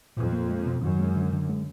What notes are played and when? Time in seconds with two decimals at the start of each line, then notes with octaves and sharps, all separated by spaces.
0.17 F2 A#2
0.33 A#3
0.49 G#3
0.66 B2
0.82 F#2 D#3
0.99 G#3
1.16 D3
1.33 D3
1.49 G#3